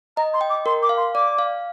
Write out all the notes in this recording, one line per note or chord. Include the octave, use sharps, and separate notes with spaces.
D#5 A#5
C6
G5
D6
A#4 C6
D6
F5
C6
D5 D6
F5